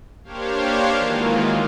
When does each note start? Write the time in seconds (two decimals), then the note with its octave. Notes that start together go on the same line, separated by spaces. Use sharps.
0.24 A#3 D4 G4 C5 C#5 F5
0.96 D#3 E3 F#3 G#3 A#3 F4